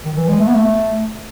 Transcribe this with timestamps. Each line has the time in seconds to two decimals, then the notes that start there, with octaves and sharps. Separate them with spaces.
0.06 D#3
0.17 E3
0.29 G#3
0.40 A3
0.48 B3
0.55 A3